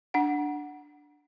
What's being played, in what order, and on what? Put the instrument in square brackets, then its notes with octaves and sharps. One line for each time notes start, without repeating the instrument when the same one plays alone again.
[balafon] D4 F#5